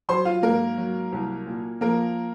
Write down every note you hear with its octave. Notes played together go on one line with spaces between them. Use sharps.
F#3 C5 C6
F4 F5
G#2 A#3 A#4
F#3
C2
A#2
F3 A#3 A#4